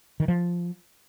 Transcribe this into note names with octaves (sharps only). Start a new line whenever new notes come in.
D#3
F3